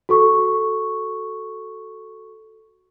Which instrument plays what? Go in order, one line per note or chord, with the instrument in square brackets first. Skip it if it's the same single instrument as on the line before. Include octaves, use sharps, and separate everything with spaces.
[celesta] F#4 A4 C#6